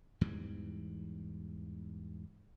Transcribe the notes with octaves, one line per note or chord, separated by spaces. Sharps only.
E2 G#2 E3 G3